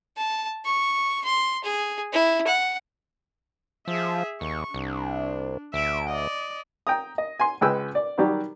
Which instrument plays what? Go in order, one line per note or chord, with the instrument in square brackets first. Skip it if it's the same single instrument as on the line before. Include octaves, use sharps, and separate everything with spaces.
[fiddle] A5
C#6
C6
G#4
E4
F#5
[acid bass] F3 [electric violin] G#4 E5
[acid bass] D#2 [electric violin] C#6
[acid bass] C2 [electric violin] D4
[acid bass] D2 [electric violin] E5 D7
[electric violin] D5 D#5
[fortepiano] G5 A#5 D#6
D#5
G#5 C6
C#2 G#3 B4 G5 E6
D5
D#3 F#3 G3 G4 D5